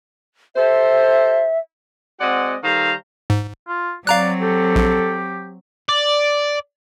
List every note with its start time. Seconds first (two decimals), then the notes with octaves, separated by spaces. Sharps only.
0.56 G4 A4 C5 E5
2.20 G#3 C4 F#4 D5 D#5 F#5
2.63 D#3 G3 A4 C5 F5 A#5
3.30 G#2
3.68 F4
4.07 F#3 C4 D5 F5 A#5 F#6
4.41 G4 A4
4.76 A#1
5.89 D5